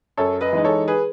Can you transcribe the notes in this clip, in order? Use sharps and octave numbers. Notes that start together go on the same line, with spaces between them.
F#2 A4 C#5
B4 D#5
E3 G#3 D#4
A4 C#5
G#4 B4